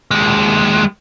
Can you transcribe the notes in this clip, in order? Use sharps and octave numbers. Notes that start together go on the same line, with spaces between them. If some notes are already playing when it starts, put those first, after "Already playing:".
D#2 G#3